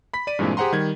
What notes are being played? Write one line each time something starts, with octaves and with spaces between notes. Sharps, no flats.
B5 B6
D5 D#7
G2 A#2 E3 G#3 C4 D4
G4 G#4 C5 F#5 A#5 C6
D#3 G3 G#6